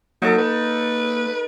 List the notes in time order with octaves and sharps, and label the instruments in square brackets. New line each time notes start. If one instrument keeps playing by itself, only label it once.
[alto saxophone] F#3 [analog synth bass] A#3 [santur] D#4 A4
[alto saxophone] B4